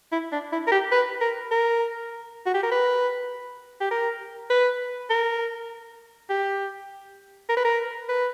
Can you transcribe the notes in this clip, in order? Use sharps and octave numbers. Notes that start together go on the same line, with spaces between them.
E4
D4
E4
A#4
G4
B4
A#4
A#4
F#4
G4
A#4
B4
G4
A#4
B4
A#4
G4
A#4
B4
A#4
B4